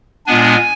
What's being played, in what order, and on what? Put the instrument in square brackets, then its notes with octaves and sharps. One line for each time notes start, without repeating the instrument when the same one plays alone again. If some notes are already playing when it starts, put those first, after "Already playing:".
[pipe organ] A#2 G#3 B3 D4 G#5